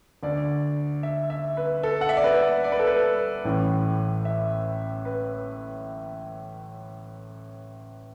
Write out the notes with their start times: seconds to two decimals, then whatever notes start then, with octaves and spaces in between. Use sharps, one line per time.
0.23 D2 D3 D5
1.03 E5
1.30 E5
1.57 B4
1.83 A4
2.01 F#5
2.09 E5
2.17 D5
2.24 B4
2.64 D5
2.72 B4
2.79 A4
2.87 B4
3.45 A1 A2 E3
4.25 E5
5.05 B4